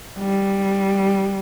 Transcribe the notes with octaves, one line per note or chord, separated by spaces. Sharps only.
G3